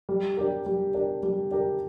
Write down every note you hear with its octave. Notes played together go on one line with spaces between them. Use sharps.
G3
D4 G4 A#4
G3
D4 G4 A#4
G3
D4 G4 A#4